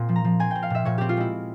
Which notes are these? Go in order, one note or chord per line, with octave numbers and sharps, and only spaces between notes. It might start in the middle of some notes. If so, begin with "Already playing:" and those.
Already playing: A#2 C4 C6
F3
A#5
F3
C4 G#5
C4 G5
F5
A#2 E5
A#2 C#5
C4 G4
F4
G#3 E4